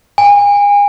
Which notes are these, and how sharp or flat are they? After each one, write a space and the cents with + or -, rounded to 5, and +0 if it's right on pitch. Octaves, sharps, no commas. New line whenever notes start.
G#5 -35